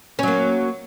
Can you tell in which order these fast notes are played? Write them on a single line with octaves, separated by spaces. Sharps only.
C#4 F#3 A#3